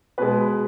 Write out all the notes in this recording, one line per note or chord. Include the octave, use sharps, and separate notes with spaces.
B2 G#3 B4